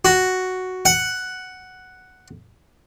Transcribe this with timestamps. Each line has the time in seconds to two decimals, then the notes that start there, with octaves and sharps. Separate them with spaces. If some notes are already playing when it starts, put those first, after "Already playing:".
0.05 F#4
0.85 F#5